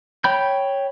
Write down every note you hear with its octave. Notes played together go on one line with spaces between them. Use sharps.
C#5 G5 B5 G6